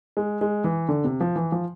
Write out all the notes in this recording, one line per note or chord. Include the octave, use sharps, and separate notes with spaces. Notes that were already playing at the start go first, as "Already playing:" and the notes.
G#3
G#3
E3
D3
C3
F3
E3
F3